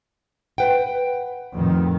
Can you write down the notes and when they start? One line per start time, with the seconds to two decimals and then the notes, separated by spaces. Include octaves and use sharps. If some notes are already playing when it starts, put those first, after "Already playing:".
0.58 B4 F#5 G5
1.52 F2 A2 D#3